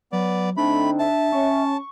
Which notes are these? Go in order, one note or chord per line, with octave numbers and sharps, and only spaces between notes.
F#3 B3 D5
D3 A3 C4 D4 D#4 B5
E5 A5
C#4 C#6